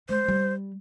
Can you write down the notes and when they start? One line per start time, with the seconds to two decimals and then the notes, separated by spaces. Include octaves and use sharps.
0.09 G#3 C5
0.28 G3